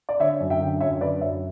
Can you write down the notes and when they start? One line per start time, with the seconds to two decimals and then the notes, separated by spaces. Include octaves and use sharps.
0.09 D5
0.20 D3 C#5 E5
0.40 F#2
0.50 E5 G5
0.60 D3
0.81 F#2 C#5 E5
1.01 D3 B4 D5
1.21 F#2 C#5 E5